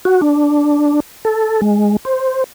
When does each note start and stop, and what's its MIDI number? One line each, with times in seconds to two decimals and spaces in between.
0.05 0.21 66
0.22 1.00 62
1.25 1.61 69
1.62 1.97 56
2.05 2.44 72